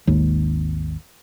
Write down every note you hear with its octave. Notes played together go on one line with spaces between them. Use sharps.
G#1 D#2